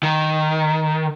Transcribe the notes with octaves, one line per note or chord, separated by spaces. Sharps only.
D#3